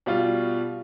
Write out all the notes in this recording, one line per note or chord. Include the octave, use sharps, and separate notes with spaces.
B2 G3 F4